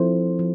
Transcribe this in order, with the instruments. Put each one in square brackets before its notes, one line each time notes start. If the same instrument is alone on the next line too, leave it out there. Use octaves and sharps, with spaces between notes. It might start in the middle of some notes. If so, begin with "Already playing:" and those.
Already playing: [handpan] F3 C4 E4 A4 C5
F3